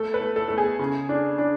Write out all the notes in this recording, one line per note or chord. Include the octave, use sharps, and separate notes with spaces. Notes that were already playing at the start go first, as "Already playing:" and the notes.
Already playing: A3 A4
B4
A3
A4
A3 A4
G#4
C#3
D4
D4